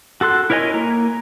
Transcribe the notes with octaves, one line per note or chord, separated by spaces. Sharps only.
F#4 A4 C6 F#6
E4 A#4 C#5 D#5 G#5
A#3 A#5